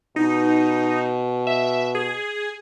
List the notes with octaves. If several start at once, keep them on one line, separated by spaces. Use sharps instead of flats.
B2 D#4
E5
G#4